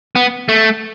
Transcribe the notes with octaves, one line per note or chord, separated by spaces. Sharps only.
B3
A3